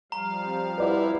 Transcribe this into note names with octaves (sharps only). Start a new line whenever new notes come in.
F3 G3 F5 A#5
C4
E4 B4 D5 F#5